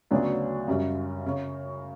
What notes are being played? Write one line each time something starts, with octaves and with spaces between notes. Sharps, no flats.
D2 C#3 F#3 B3 D4
F#2 C#3 G3 C#4
C#3